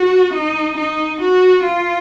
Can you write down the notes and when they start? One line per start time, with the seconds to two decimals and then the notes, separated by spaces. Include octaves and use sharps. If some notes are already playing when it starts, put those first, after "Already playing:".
Already playing: F#4
0.33 D#4
0.77 D#4
1.21 F#4
1.65 F4